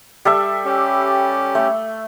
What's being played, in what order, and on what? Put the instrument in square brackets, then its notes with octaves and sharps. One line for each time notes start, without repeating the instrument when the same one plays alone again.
[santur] G3 A4 E5
[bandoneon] C#4 G4
[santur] A3